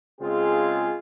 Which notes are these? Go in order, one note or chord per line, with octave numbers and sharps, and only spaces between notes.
C#3 G#3 C4 F4 G#4